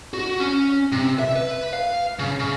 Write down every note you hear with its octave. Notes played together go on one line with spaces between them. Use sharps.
F#4
C#4
C3
E5
B4
F5
C#3
C#3